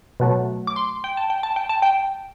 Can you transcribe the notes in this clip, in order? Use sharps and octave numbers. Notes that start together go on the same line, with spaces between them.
B2 F#3 A3
D6
C6
G5
A5
G5
A5
G5
A5
G5